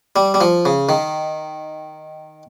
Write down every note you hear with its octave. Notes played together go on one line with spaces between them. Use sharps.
G3
G3
F3
C#3
D#3